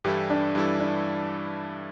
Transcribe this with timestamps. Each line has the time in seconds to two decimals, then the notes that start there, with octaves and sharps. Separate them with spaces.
0.04 G2 E3 G3 E4 G4 A4
0.30 D4
0.55 G2 E3 G3 E4 A4
0.80 D4